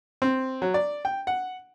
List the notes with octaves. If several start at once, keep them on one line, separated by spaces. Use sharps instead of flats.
C4
F#3
D5
G5
F#5